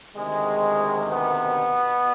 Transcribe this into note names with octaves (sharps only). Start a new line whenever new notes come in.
D2 C3 D#3 G#3
B2 B3